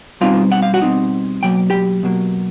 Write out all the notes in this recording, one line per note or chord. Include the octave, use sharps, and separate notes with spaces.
B2 G3 C4 D#4 F4 F5
F#5
F5
F#4 F#5
B2 G3 C4 D#4
B2 F#3 A#3 G5
G4 G5
B2 F#3 A#3